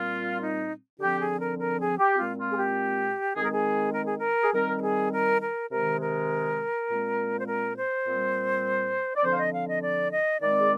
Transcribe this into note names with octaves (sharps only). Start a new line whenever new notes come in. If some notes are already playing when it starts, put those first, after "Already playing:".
Already playing: A#2 G3 C4 F4
D#4
D3 F3 C4 G4
G#4
A#4
A#4
G#4
G4
A#2 G#3 C4 F4
F4
G#4
G4
D#3 G#3 C4 G#4
A#4
G#4
A#4
G#4
A#4
G#4
D#3 G3 C4 A#4
A#4
G#4
A#4
A#4
C3 D#3 G#3 A#4
A#4
A#2 G#3 C4
C5
A#4
C5
A#2 G3 C4
D5
D3 F3 C4 C5
F5
D#5
F5
D#5
D5
D#5
D#3 G#3 C4 D5
G#4